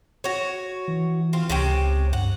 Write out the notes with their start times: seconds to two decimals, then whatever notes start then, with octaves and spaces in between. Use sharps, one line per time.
0.24 F#4 C#5
0.88 E3
1.33 C4 F4
1.50 C#2 C3 C#4 G5
2.13 G2 F#5